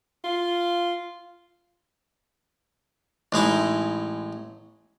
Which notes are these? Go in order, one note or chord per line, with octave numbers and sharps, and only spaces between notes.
F4
A1 G#3 D#4 E4